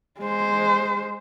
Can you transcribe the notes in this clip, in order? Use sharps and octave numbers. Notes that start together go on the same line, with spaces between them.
G#3 C5